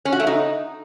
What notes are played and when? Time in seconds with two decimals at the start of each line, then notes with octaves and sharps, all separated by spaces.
0.05 C#4
0.12 F#4
0.20 A3
0.27 D#4